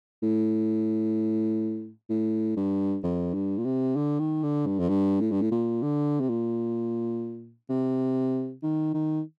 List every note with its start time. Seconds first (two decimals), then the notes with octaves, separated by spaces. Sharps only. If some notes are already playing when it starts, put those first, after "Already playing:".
0.23 A2
2.10 A2
2.56 G2
3.03 F2
3.34 G2
3.58 A#2
3.65 C3
3.96 D3
4.19 D#3
4.43 D3
4.66 G2
4.79 F2
4.89 G2
5.21 A2
5.31 G2
5.42 A2
5.51 A#2
5.83 D3
6.20 C3
6.29 A#2
7.70 C3
8.63 D#3
8.94 D#3